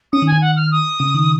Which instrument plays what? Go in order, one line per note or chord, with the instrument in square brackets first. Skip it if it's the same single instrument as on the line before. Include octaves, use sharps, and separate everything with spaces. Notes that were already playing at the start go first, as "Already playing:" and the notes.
[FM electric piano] C#4 [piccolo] D#6
[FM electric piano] D#3
[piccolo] G#5
[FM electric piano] D#3
[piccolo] F#5
F6
D#6
[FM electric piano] C#3
D#3